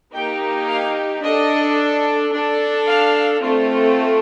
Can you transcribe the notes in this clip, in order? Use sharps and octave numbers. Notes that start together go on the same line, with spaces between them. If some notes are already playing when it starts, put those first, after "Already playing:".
A#3 D#4 G4 G5
F5
D4 A4 D#5
D4 A4
F5
A3 C4 F4 A4